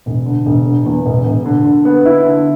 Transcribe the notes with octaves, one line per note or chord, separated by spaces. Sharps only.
E1
D3
E1
D3
E2
E1
E1
D3
D3
B3
E4
D3